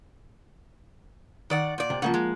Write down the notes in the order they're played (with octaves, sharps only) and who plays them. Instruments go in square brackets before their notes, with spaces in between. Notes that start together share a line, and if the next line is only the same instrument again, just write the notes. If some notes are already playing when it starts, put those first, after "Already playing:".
[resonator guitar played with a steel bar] D#3 D5 F#5
A#2 D5
[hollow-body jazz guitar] C3
[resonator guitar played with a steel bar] C#3 [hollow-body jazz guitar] F3 A#3 F#5
[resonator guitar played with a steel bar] G#3